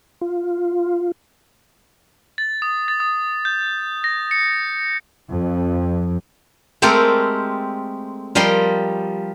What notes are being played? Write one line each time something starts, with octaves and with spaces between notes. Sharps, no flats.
F4
A6
D#6
A6
D#6
G6
A#6
C#7
F2
G#3 A3 C4 G4 A4 A#4
F3 G3 A#4 D#5 C6